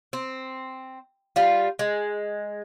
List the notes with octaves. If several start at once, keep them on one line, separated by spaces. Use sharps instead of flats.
C4
G3 F4
G#3